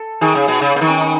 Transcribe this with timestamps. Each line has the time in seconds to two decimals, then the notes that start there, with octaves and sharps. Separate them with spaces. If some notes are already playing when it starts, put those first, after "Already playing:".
Already playing: A4
0.21 D#3 G#4
0.35 C#3
0.48 B2
0.61 C#3
0.75 C#3 B3
0.81 D#3
0.87 C#4
1.00 D#4